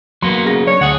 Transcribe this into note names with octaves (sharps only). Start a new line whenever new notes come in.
F#3 A#3 B3 C6
C#3 A#6
D4 C#5
D2 G#4 F#5